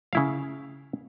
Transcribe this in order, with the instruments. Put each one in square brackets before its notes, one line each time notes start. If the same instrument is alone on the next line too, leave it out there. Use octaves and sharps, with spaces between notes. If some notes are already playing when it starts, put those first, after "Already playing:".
[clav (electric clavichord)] C#3 E4 F5